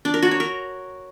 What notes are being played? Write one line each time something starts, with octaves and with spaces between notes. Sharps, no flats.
D4
A#4
F#4
C#5
A#4